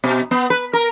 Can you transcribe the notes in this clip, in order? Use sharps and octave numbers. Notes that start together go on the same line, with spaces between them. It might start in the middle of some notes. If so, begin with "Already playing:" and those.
B2
B3
B4
A#4